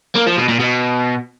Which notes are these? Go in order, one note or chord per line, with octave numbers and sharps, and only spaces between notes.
A#3
F3
B2
A#2
B2